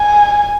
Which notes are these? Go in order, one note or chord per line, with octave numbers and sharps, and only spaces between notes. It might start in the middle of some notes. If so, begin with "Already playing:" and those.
Already playing: G#5